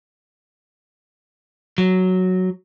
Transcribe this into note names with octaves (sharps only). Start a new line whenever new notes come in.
F#3